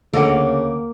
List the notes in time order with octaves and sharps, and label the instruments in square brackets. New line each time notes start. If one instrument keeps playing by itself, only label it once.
[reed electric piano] D2 D6 [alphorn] C#3 [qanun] A#3 [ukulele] A4 D#5 F#5